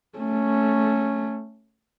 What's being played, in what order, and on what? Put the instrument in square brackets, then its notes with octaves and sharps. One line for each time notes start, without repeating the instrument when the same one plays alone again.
[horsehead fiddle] A3 C#4